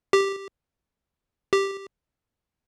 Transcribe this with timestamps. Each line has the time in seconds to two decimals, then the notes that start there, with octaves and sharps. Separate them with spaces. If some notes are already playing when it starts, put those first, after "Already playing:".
0.13 G4
1.53 G4